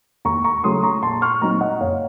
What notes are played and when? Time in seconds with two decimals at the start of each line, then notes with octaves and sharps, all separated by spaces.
0.25 D#2 A#5 C#6
0.44 A#5 C#6
0.64 C#3 F#3 A3 C#4 C6 D#6
0.83 A#5 C#6
1.03 A#1 A5 C6
1.22 C#6 F6
1.42 A#2 F#3 C4 D#4 A#5 C#6
1.61 D#5 F#5
1.81 F#1 C#5 F5